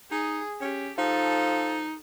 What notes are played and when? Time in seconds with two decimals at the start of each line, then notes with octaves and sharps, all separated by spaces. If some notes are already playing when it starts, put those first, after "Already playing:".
0.11 D#4 G#4
0.61 C#4 G4
0.98 F3 D#4 A4